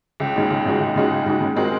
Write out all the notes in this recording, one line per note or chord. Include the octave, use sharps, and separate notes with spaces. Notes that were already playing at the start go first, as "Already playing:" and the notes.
C#2
C#3 G#3 D#4 F#4
C#2
C#3 G#3 D#4 F#4
C#2
C#3 G#3 D#4 F#4
C#2
C#3 G#3 D#4 F#4
C#3
G#3 C4 F#4 A#4